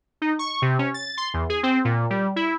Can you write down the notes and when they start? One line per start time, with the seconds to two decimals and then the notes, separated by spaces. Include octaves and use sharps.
0.22 D#4
0.39 C#6
0.62 C3
0.79 C#4
0.94 A6
1.18 C6
1.34 E2
1.50 G#4
1.63 C4
1.85 A#2
2.10 G3
2.36 E4